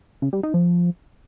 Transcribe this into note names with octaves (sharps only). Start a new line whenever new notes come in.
C#3
G3
D#4
F3